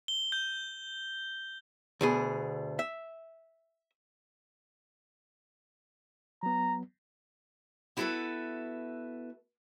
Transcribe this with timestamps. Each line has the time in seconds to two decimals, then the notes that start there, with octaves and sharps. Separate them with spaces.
0.08 G7
0.32 G6
2.01 D2 B2 G#4
2.79 E5
6.43 F#3 B3 A#5
7.97 B3 E4 F#4 A4 B4 E5